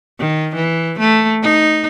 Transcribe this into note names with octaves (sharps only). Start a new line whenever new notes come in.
D#3
E3
A3
D#4